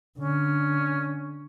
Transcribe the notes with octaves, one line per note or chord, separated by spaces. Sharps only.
D3 C#4